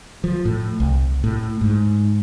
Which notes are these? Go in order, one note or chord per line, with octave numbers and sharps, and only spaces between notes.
F3
A2
C2
A2
G#2